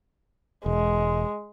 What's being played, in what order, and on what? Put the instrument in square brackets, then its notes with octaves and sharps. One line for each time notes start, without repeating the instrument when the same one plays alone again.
[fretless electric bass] E1 [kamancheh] G#3